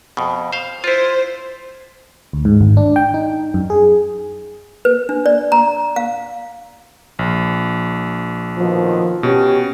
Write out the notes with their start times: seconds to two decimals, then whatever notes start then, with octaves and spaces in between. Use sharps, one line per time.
0.17 F2 B2
0.53 C5 F5
0.84 E4 F4 C5
2.33 D2
2.45 G#2
2.61 G#1
2.77 D4
2.96 G5
3.14 D#4
3.54 F#2
3.70 G#4
4.85 B4
5.09 D4
5.26 D5
5.52 A#5
5.96 F5
7.19 A#1
8.58 B2 D#3 F3
9.23 B2 C#4 G4